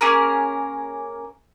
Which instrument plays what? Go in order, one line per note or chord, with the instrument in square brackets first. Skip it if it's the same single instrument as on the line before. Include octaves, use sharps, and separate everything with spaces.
[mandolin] A#3 C#4 G#4 A#4